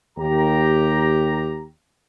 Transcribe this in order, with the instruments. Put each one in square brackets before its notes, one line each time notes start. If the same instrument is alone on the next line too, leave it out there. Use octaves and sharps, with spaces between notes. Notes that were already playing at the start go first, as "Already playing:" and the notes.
[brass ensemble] D#2 G4 A#5